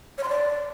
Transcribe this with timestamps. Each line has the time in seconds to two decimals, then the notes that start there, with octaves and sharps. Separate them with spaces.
0.18 C#5
0.23 C6
0.29 D5